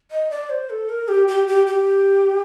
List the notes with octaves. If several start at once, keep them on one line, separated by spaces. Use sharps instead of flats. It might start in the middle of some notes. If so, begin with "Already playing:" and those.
D#5
D5
C5
A4
A#4
G4
G4
G4
G4